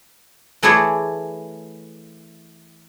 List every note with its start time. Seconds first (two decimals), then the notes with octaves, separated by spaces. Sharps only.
0.63 E3 A3 E4 G#4 C#5 D5